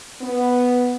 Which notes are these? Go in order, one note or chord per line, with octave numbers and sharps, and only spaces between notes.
B3